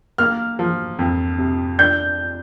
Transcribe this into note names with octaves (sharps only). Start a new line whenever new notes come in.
A#3 F6
F3
F2
C3
D4 G6